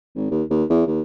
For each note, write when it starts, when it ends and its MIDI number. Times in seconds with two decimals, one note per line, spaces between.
0.15 0.28 32
0.31 0.43 39
0.50 0.64 39
0.69 0.86 40
0.87 1.01 39